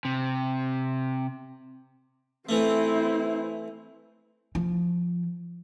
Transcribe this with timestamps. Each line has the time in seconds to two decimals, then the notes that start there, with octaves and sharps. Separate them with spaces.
0.05 C3
2.49 E3 A3 C4 E4
4.55 F3